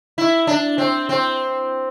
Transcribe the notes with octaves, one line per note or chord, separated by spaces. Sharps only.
E4
D4
C4
C4